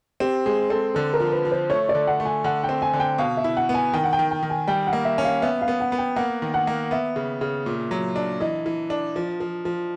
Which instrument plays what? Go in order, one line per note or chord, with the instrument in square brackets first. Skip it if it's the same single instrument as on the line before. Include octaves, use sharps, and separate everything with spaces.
[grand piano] C4 [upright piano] G4
[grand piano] G#3 [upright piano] G#4
[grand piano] C4 [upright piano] A4
[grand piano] D3 [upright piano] A4
[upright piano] A#4
[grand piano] F3
[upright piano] B4
[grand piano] F3
[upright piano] C5
[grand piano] A3 [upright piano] C#5
[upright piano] D5
[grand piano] D3
[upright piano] F#5
[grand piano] A3
[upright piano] G#5
[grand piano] D3 [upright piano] F#5
[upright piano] G5
[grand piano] C4
[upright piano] G#5
[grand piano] D3
[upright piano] G5
[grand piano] B2 [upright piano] F5
[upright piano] E5
[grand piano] E4
[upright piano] F#5
[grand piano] B3
[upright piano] G#5
[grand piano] D#3 [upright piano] G5
[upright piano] F#5
G5
[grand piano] D#3
[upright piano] G5
[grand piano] D#3
[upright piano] G#5
[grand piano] G3 [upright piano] G5
[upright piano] F#5
[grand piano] A#3
[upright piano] E5
[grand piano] C#4
[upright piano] F5
[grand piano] B3 [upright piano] E5
[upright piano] F5
[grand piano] B3
[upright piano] F#5
[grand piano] B3
[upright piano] G5
[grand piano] A#3 [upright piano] F#5
[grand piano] D#3
[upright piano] F#5
[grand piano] A#3
[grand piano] B3 [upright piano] E5
[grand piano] C#3
C#3
A#2
F#3
D4
[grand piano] E3 [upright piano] D#5
[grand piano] E3
D4
F3
F3
F3